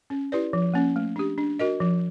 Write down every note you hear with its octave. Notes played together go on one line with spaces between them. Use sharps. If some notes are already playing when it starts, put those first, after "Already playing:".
C#4
E4 G4 B4 D5
F3
A#3 C#4
A3
D4 G4
D4
F#4 A#4 D#5
F3